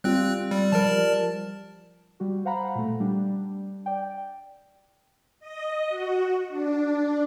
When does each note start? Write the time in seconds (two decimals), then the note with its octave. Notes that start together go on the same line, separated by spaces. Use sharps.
0.04 G3 C4 F4 F#6
0.51 G3
0.72 F3 G3 A#4 D5 A5
2.20 G3 F#4
2.45 C5 F5 F#5 A#5 B5
2.75 A#2 A3
3.00 G3 D4
3.86 D5 G5
5.40 D#5
5.89 F#4
6.49 D4